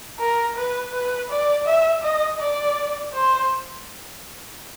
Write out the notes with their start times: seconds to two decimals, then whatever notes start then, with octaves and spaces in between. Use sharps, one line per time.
0.19 A#4
0.56 B4
0.93 B4
1.30 D5
1.66 E5
2.03 D#5
2.40 D5
3.13 C5